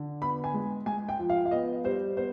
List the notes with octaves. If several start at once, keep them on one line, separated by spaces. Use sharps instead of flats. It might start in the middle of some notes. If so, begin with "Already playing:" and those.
Already playing: D3
B3 B5
G#5
G#3
G#3 G#5
G5
F3
F5
F5
B3 D#5
G3 C5
B3 C5